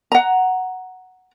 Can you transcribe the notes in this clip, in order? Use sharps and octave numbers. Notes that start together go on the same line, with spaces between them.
F#5 A#5